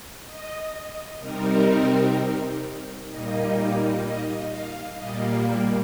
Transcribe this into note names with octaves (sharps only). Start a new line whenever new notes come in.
D#5
C3 G3 C4 D#4 A#4
A#2 G3 A#3 D#4 D#5
D#5
F5
A#2 G3 A#3 D#5
A#4